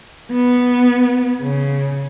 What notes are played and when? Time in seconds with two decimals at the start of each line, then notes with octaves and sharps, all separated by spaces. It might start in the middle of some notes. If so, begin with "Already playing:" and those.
0.31 B3
1.41 C#3